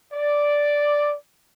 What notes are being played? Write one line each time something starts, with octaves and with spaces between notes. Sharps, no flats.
D5